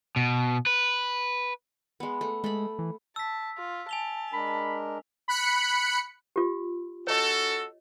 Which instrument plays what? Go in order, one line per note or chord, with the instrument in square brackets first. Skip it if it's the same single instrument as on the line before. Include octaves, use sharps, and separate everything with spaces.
[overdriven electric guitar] B2
B4
[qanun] G#3 B3
A3
[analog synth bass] G#3 [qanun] A3 B5
[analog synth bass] E3
[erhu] A5 [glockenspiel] E6 B6
[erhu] F4
[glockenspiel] G#5 F7 G7 [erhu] A5
[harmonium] G#3 D4 A#4 [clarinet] B5
[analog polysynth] B5 F#6 C#7
[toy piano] F4 G4
[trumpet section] C#4 F#4 A4 [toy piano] C#5 D#5